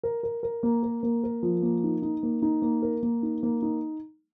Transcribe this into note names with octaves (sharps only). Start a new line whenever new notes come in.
A#4
A#4
A#4
A#3
A#4
A#3
A#4
F3
A#3
D#4
D#4
A#3
D#4
A#3
A#4
A#3
D#4
A#3
D#4